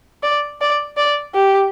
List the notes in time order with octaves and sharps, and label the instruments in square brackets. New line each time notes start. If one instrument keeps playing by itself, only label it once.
[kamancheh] D5
D5
D5
G4